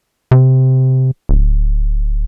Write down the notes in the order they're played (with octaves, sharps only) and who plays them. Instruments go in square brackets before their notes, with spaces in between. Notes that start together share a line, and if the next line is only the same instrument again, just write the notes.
[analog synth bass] C3
D1